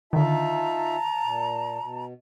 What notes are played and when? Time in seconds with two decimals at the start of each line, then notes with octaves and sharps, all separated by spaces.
0.13 D3 D#3 D#4 F4 E5 A5 A#5
1.23 A#2
1.79 B2